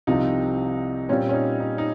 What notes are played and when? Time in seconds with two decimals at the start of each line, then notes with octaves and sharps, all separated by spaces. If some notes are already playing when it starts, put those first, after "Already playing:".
0.07 C2 C3 F3 C4 D#4 F4
1.09 A#2 G3 C4 C#4 F4
1.29 C#4
1.34 D#4
1.60 D#4
1.78 D#4